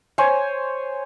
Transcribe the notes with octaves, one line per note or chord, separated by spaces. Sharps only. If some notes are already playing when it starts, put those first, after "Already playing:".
C5 C#5 G#5